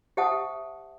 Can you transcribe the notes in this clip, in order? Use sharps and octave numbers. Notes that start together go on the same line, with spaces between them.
G4 C5 E5 F#5 A5 D#6